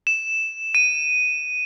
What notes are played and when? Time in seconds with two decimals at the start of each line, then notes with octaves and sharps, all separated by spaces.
0.07 E7
0.75 D#7